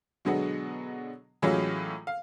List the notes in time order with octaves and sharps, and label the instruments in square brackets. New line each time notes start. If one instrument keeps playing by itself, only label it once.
[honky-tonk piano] B2 D3 F#3 G#3 B3
A2 E3 F#3 G#3 C#4 F4
F5